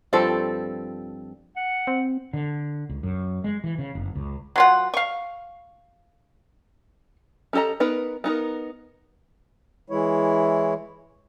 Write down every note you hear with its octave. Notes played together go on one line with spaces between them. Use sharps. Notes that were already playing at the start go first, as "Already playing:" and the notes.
G2 F3 C4 A4
F#5
C4
D3
C#2
F#2
G#3
E3
C#3
F#1
C#2
F#3 F4 F#5
F5 C#6
C#4 G4 A4 D#5 A#5
B3 D#4 A#4 B4
B3 D#4 A#4
E3 G#3 E4 C#5